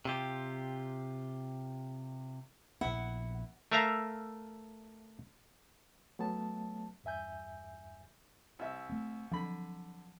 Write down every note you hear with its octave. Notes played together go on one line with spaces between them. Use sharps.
C3 F4 G4
A#1 B3 E4 F#5
A3 A#4 E5 F5 A#5
F#3 A3 B3 A5
E2 G2 E5 G#5 G6
C2 E5
A3 C4
D3 F3 F#3 C4 B5